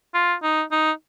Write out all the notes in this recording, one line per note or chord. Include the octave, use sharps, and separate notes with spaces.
F4
D#4
D#4